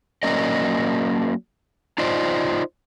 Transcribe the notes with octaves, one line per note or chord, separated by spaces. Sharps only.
F#3 A#3 C#4 A#4 D5 D#5
D#4 F4 C5 D5 D#5